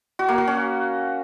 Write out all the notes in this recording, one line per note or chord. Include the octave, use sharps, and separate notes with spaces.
F#4
A#3
F#4
C#4